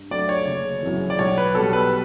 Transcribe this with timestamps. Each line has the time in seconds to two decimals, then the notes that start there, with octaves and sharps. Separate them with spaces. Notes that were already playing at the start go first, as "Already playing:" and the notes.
Already playing: G2
0.11 F#3 A3 D4 D5
0.29 C#5
0.47 F#1
0.83 F#2 C#3 E3
1.10 D5
1.19 B1 C#5
1.38 B4
1.55 B2 G3 A4
1.73 B4